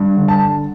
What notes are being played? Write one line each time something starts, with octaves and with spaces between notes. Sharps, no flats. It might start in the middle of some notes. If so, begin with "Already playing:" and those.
Already playing: G2
D3
A5